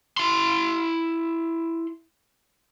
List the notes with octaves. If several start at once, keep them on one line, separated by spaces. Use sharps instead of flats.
E4 C6